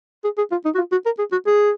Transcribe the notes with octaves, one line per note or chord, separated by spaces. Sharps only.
G#4
G#4
F4
D#4
F#4
F4
F#4
A#4
G#4
F#4
G#4